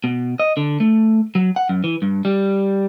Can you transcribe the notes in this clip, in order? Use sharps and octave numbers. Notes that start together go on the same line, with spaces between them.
B2
D#5
D3
A3
F#3
F#5
F#2
E3
G2
G3